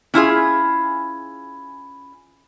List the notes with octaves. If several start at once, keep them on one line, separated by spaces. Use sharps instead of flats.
C#4 E4 F4 G#4